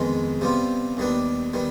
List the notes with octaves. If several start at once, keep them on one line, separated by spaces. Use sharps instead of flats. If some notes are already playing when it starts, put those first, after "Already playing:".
Already playing: F2 D#3 G#3 B3
C3 G3 B3 F4
D#2 D#3 G3 B3 D4
D#3 G3 B3